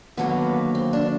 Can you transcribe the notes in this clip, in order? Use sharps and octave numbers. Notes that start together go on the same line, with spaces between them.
D#2 D3 F#3 A#3 B3
C4
D4